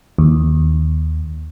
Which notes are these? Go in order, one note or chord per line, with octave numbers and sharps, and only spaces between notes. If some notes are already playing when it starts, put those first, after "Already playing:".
D#2